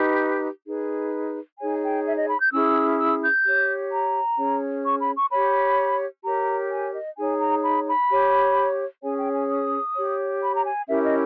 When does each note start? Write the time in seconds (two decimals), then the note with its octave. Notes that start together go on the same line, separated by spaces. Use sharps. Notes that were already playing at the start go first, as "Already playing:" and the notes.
Already playing: D#4 G4 B4
0.66 D#4 G#4 B4
1.59 D#4 G#4 C#5 G#5
1.83 G5
2.06 E5
2.17 D#5
2.29 B5
2.40 G6
2.52 C#4 E4 G#4 E6
2.99 E6
3.22 G6
3.45 G4 C#5
3.92 A#5
4.38 C#4 G#4 C#5
4.85 C#6
5.00 B5
5.16 C#6
5.31 G4 C#5 B5
6.24 G4 A#4 C#5 A#5
6.71 G#5
6.94 D#5
7.16 D#4 G#4 C#5 G#5
7.40 A#5
7.63 B5
7.87 B5
8.10 G4 C#5
9.03 C#4 G#4 C#5 G#5
9.18 G5
9.33 G#5
9.49 D#6
9.95 G4 C#5
10.42 B5
10.55 A#5
10.65 G#5
10.88 C#4 E4 G4 A#4 E5
11.04 D#5